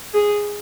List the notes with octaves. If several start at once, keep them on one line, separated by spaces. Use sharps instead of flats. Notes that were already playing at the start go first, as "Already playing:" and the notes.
G#4